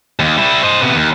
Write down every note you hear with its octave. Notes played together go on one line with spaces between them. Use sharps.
D#2
G3 E4
C5 D#5
C3 B3
D#2